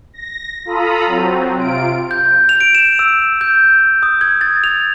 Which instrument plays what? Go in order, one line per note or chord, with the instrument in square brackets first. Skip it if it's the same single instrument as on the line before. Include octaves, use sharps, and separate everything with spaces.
[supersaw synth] A#6
F4 A4 A#5 B5 D#6
F#3 C4
C3 F4 D7
[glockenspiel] G6
F7
D7
E7
E6
G6
D#6
G#6
A6
F7